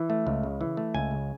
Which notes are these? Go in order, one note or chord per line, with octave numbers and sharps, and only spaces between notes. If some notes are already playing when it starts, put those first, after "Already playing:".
Already playing: E3
A3
C#2
C#3
E3
A3
C#2 G#5
C#3